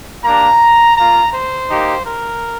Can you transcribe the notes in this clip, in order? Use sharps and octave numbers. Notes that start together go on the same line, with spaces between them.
A#3 D4 G4 A#5
A#3 F4 A#5
C5
A#3 D#4 G4
A#4